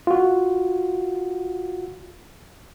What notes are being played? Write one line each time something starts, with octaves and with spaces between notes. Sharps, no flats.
F4 F#4